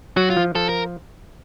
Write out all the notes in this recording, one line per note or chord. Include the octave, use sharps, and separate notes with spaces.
F#3 F#4
F4
F3
F3 A4
A#4